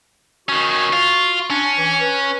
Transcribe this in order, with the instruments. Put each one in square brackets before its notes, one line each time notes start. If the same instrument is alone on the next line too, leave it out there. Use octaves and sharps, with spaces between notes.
[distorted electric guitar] D#3 C#4 [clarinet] F#4
[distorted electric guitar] F4
[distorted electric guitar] C#4 [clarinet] D4
[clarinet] E3
B4